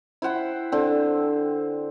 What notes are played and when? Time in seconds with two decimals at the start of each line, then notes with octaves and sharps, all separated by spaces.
0.22 E4 C5 F#5 G5
0.72 D3 C4